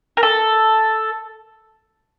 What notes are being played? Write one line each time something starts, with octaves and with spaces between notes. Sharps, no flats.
A#4
A4